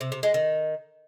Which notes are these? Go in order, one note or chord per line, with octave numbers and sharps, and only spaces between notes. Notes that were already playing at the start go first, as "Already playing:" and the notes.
C3
C3
G#3
D#3